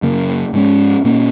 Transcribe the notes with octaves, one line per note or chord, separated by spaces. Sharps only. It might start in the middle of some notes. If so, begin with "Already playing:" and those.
F#2 C#3 A#3
G#2 G#3 C#4
A#2 A#3 C#4